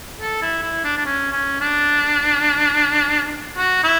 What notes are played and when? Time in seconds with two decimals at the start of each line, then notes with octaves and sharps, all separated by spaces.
0.21 A4
0.42 E4
0.62 E4
0.84 D4
0.97 D4
1.05 C#4
1.32 C#4
1.60 D4
3.57 F#4
3.83 E4